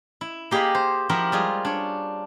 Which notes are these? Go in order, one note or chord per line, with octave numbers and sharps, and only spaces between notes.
E4
A#3 G4 G#4 D#5 F5 B5
C5
F3 E4 F#4 G4 A#4
G3 G#3 F4 G#4
D4 C#5